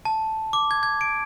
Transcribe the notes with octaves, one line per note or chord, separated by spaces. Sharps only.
A5
D6
G#6
G#6
D7